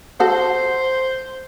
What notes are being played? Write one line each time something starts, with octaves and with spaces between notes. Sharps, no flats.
F#4 A4 C5